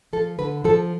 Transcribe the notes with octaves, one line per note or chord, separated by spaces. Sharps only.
F3 A4
D3 B4
F3 A4